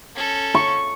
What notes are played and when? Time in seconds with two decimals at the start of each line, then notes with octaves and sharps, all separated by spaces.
0.16 C#4 A4
0.55 C#6